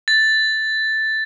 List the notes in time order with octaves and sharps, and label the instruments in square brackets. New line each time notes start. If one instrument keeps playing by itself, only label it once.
[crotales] A6